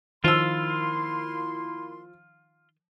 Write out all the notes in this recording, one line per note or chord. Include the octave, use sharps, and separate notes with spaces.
D#3 F3 A#3 E4 F4 C6 E6